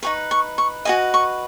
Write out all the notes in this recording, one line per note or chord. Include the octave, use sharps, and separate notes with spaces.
D#4 G#4 B4 C#6
C#6
C#6
F#4 B4 D#5 G#5
C#6